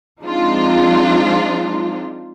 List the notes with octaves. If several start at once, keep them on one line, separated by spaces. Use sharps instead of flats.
F3 G#3 C4 D4 D#4 F4